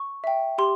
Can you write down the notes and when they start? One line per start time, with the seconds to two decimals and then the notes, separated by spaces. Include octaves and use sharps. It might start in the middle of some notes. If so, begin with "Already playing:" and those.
Already playing: C#6
0.24 E5 G5
0.58 G4 C6